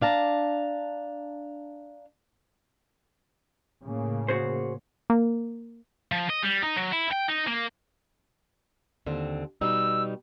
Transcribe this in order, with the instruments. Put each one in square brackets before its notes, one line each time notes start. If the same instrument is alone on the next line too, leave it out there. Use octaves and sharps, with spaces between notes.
[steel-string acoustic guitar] D4 F5 A5 A#5
[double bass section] A2 C#3 A#3
[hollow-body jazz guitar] F#4 G#4 C5
[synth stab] A#3
[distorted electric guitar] F3
D#5
G3
D#4
F#3
E4
G5
D#4
A#3
[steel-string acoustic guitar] D#2 D3 C4
[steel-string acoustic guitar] B2 G3 D#4 [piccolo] E6